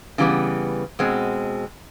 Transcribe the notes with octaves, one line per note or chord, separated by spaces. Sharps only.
C#3 E3 G3 B3
B2 G#3 C4